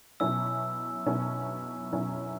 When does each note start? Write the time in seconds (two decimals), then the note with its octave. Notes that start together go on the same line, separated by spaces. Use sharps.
0.20 B2 F#3 C#4 E4 E6
1.06 B2 F#3 C#4 E4
1.93 B2 F#3 C#4 E4